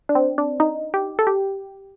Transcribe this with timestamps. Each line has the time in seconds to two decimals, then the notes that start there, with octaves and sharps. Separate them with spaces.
0.09 D4
0.15 C4
0.38 D4
0.60 D#4
0.94 G4
1.19 A4
1.27 G4